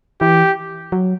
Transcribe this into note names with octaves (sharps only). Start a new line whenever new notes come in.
E3 G4
F#3